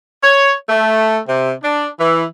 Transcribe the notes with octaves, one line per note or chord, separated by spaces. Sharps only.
C#5
A3
C3
D4
E3